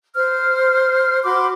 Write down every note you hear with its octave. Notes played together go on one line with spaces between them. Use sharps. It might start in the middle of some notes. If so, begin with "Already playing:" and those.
C5 F6
F#4 B5 C6 D6